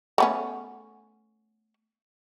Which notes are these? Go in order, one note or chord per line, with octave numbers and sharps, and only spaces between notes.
A3 B3 C#4